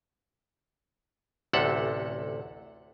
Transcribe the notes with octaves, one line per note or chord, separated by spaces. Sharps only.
A1 D2 C3 A4 F#5